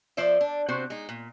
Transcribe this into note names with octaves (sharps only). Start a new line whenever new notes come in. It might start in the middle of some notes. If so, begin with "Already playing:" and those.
F3 C5 D5 E5
D4
C3 C4 F#4 C5
G#3 D#4
A#2